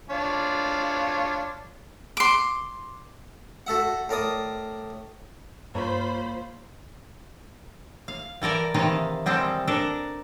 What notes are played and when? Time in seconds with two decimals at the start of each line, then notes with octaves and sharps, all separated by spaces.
0.10 D4 F4 C#5
2.17 C6 D6
3.67 F#4 A4 E5 F#5
4.09 A2 A#4 D5 D#6
5.75 G2 A#3 F4 C5 C#5 B5 C6
8.08 F5
8.42 E3 A4 A#4 D5 A#5
8.74 C3 D#3 E3 A4 D#5 F5
9.26 G3 G#3 C4 A4
9.67 D4 A4 A#4